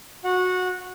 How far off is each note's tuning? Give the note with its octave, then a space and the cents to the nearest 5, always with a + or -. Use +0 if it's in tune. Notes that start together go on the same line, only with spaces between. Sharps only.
F#4 -15 F#5 -20